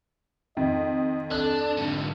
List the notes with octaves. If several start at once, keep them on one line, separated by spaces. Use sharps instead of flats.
F2 D#3 D#5
D4 A4 F#6
G#2 D3